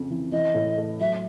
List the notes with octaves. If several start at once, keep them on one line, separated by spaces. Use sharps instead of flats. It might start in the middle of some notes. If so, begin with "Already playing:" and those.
Already playing: F2 C#3
E3
E3 D#5
A2
A3
F#3 E5